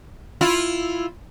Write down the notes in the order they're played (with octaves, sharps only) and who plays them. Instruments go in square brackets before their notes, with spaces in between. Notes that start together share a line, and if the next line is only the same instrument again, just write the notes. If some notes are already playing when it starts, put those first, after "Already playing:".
[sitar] E4 F4